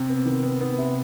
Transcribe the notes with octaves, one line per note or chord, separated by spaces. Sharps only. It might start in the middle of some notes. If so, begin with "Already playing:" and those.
Already playing: C3
B3
D#3
B3
B3
C3